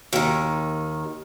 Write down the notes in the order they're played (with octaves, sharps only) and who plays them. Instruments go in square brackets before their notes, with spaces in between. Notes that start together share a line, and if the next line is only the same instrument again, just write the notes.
[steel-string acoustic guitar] D#2 D#3